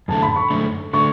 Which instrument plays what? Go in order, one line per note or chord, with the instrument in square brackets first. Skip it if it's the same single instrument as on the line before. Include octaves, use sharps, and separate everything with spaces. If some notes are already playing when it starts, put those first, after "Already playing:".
[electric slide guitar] F#2 D3 A3 [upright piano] A5
[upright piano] B5
C#6
[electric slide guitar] F#2 D3 A3
[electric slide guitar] D3 A3 [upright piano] C#6